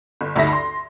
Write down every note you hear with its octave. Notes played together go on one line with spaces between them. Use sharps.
G1
D2 G2 D#4 E5 A#6
C6